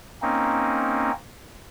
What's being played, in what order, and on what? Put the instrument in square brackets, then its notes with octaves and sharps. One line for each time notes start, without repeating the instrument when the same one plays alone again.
[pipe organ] A#3 C4 C#4 D#4